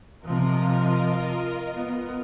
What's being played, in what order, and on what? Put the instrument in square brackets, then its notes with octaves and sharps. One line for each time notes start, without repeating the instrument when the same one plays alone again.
[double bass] C3 F3 [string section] F4 A#4 D#5
[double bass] B3